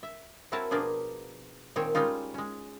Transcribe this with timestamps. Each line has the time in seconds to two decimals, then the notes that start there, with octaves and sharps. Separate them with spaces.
0.03 E5
0.52 C4 E4 F#4 A#4 C#5 A5
0.71 B2 F3 A#3 D4 F4 G#4
1.76 A#2 D#3 C4 C#5
1.95 G3 G#3 C#4 D#4 F4
2.34 G#3 C#4